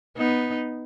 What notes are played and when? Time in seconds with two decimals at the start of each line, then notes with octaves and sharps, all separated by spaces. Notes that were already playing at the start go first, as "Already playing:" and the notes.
0.17 B3 D#4